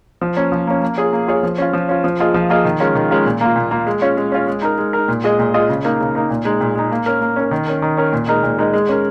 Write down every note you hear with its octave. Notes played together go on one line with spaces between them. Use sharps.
F3
A#3 C#4
F3
A#3 C#4
A#3
F4 G#4 C#5
A#3
F4 G#4 C#5
F3
C#4 F4
F3
C#4 F4
F3
A#3 F4 G#4 D#5
F3
A#3 F4 G#4 D#5
D#3
G#3 C#4 F4 A#4
D#3
G#3 C#4 F4 A#4
A#2
A#3 F4
A#2
A#3 F4
G#3
C#4 F4 C#5
G#3
C#4 F4 C#5
G#3
D#4 A#4
G#3
D#4 A#4
A#2
G#3 F4 G#4 D#5
A#2
G#3 F4 G#4 D#5
C#3
A#3 D#4 A#4
C#3
A#3 D#4 A#4
A#2
G#3 D#4
A#2
G#3 D#4
A#3
C#4 A#4
A#3
C#4 A#4
D#3
C#4 A#4
D#3
C#4 A#4
A#2
G#3 D#4 A#4 D#5
A#2
G#3 D#4 A#4 D#5
G#3
C#4 A#4